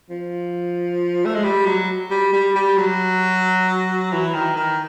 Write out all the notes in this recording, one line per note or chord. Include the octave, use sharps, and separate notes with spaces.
F3
A3
G#3
G3
F#3
G3
G3
G3
F#3
E3
D#3
D#3